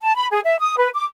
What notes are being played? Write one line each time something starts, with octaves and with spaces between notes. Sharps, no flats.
A5
B5
G#4
E5
D#6
B4
D6